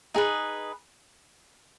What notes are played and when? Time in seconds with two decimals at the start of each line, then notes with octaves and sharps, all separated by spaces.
0.14 D#4 G#4 B4